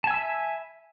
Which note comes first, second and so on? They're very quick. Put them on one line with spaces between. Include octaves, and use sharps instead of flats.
A5 G#5 E6 B5 E5